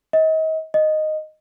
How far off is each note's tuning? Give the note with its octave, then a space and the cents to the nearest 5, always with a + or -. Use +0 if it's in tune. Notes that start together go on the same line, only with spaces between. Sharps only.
D#5 +35
D#5 -5